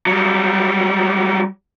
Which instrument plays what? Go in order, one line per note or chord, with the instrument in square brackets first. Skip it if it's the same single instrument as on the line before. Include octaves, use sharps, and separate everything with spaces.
[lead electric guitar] F#3 G3